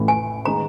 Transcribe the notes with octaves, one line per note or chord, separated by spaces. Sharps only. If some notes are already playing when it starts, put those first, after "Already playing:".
Already playing: A1 A2 E3
G#5
D#3 G#3 B3 A#5